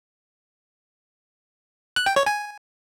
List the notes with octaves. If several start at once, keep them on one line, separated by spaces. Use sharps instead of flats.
F#6
G5
C#5
G#5